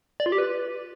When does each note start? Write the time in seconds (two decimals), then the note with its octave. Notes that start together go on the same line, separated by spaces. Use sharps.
0.20 D5
0.26 F4
0.32 G4
0.38 B4